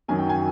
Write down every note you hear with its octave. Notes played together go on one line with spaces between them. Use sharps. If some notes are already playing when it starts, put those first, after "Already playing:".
F#2 D#3 F#3 G#5
G5
G#5